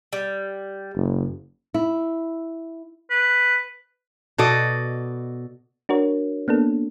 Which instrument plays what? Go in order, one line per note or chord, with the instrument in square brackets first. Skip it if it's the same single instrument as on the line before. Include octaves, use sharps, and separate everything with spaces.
[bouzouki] G3
[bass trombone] F#1
[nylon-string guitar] E4
[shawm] B4
[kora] B2 A4 D5 D#5
[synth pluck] D4 F#4 A#4 C#5
A#3 B3 D4 A4